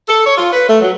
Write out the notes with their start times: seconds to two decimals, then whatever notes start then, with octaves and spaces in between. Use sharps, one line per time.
0.08 A4
0.26 C#5
0.37 F4
0.52 B4
0.68 A3
0.81 F#3